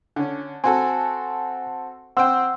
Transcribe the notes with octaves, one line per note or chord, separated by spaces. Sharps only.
D3 C#4
C4 F#4 A4 G#5
C4 C5 F#5 G5 C6 E6